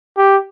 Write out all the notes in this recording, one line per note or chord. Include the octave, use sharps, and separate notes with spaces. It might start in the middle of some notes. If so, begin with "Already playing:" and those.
G4